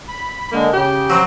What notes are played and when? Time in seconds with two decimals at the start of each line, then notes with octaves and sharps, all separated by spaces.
0.08 B5
0.52 D3 G#3 A#3
0.73 C#3 G4
1.10 F#3 C4